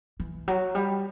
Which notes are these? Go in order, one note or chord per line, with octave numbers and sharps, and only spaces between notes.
E3
F#3
G3